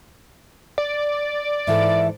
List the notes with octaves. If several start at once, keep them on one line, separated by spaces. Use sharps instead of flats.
D5
G#2 E3 A4 E5